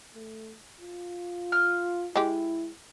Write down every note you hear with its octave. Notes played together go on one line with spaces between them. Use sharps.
A3
F4
F6
G#3 E4 G4